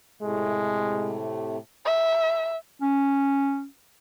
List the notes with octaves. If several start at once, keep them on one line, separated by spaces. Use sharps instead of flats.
A2 C3 G#3 A3
E5
C#4